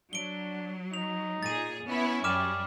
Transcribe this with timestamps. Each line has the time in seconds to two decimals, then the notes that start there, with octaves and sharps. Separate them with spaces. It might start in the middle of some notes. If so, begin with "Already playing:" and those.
0.13 F#3 D4 D7 G7
0.94 D#4 F7
1.43 A#2 G#4 A6 D#7
1.88 B3 C#4 E4 E5
2.24 F#2 G3 D6 F6 E7